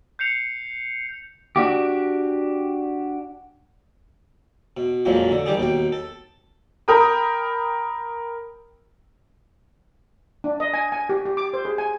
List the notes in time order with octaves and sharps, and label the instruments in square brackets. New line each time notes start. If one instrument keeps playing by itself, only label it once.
[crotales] G6 C7 C#7 F7
[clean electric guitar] D4 F#4 G4
[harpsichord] B2
A#1 F2 A#2 F3 F#3 G#3
D3
D#3 G3 G4 G#4
D#2 B2 G5
A4
[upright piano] A#4 G5 B5 D#6
[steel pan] D4
D#5
G#5
G#5
G4
G4
D6
C5
G#4
G#5